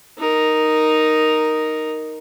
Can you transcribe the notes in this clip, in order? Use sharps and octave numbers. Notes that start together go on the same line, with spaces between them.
D#4 A#4